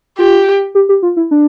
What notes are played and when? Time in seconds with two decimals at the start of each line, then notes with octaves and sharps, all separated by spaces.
0.18 F4 G4
0.75 G4
0.89 G4
1.03 F4
1.17 E4
1.31 D4